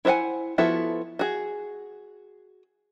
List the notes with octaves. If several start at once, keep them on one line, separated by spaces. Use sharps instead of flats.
E4 C5 E5 F#5 G#5
F3 B3 E4 F#4 A4
F#4 G#4